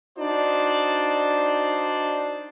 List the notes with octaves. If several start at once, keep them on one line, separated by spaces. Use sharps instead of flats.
D4 D#4 F#4 C5 D5